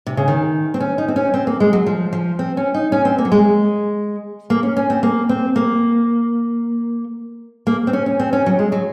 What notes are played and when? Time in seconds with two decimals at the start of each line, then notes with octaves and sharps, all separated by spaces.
0.07 C3
0.17 C#3
0.28 D#3
0.74 C4
0.80 C#4
0.98 D#4
1.08 C4
1.16 C#4
1.34 C4
1.47 A#3
1.60 G#3
1.73 F#3
1.86 F3
2.13 F3
2.39 C4
2.57 C#4
2.74 D#4
2.92 C#4
3.05 C4
3.18 A#3
3.25 F#3
3.32 G#3
4.50 A#3
4.63 C#4
4.77 C#4
4.90 C4
5.03 A#3
5.29 C4
5.56 A#3
7.67 A#3
7.87 C4
7.93 C#4
8.06 C#4
8.19 C4
8.33 C#4
8.46 F#3
8.59 G#3
8.72 F#3